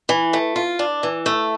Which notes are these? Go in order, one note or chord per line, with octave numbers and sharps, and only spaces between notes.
E3
A3
F4
D4
E3
A3